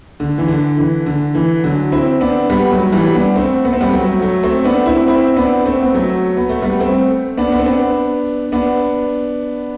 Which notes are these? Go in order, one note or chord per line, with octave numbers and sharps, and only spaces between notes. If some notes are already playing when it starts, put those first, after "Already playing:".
D3
E3
D3
E3
D3
E3
D3 F#3
C4 E4
B3 D4
G3 B3
F#3 A3
F#3
E3 G3
B3 D4
A3 C4
B3
C4
G3 B3
F#3 A3
F#3 A3
A3 C4
B3 D4
C4 E4
C4 E4
B3 D4
A3 C4
B3
F#3 A3
B3
A3
G3 B3
A3 C4
B3 D4
B3
C4
B3 D4
B3 D4